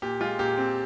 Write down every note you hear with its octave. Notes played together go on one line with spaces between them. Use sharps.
A#2 G4
G#3 F4
A#2 G4
C4